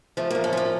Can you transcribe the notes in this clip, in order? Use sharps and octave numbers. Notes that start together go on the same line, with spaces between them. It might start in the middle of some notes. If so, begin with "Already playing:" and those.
F3 A3
A2 A#3
C#4
F3 A#3